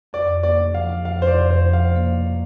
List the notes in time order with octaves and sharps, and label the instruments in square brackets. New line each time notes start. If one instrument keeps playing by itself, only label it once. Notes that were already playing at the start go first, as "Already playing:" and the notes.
[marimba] F2 [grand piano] D5
[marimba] A#3 [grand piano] D5
[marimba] F3 [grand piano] F5
[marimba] F2 [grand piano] F5
[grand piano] C5
D5
[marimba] F2
[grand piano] C5
[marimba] F3
[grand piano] F5
[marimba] A#3
A#3